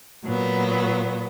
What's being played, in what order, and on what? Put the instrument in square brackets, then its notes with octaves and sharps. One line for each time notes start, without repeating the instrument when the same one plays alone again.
[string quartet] A#2 F#3 B3